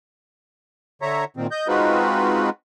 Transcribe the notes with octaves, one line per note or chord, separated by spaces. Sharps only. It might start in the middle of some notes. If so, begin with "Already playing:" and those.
D3 C#5 E5 A#5
A#2 D#3 C4
D#5 G6
G#3 C4 D#4 F4 F#4 B4